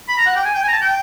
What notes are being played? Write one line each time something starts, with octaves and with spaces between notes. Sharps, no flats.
B5
A#5
F#5
G5
G#5
G5
G#5
A#5
A5
G5